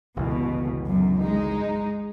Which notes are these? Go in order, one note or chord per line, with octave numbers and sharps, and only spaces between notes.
G1 C#2 B2 E3
F#2
G#3 D#4